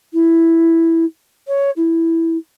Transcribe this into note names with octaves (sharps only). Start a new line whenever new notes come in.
E4
C#5
E4